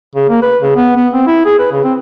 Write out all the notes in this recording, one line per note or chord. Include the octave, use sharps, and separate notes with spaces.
C#3
A#3
B4
C#3
B3
B3
C4
E4
G#4
B4
C#3
C4